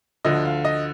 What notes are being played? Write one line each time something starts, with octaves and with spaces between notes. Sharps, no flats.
D2 D3 F3 D#5
F5
D#5